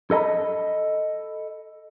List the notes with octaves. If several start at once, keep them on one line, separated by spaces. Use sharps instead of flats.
A4 D#5 A#5 B5